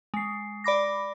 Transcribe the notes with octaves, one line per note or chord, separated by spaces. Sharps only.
G#3 C7
D5 B5 D6 A#6